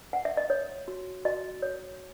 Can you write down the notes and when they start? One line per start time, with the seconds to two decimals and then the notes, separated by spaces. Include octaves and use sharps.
0.13 F#5
0.25 E5
0.37 D#5
0.50 C#5
0.88 F#4
1.25 F#4 D#5
1.62 C#5